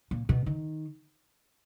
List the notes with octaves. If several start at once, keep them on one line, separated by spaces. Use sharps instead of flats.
A#2
B2
D#3